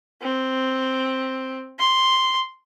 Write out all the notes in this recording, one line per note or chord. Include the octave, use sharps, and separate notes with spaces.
C4
C6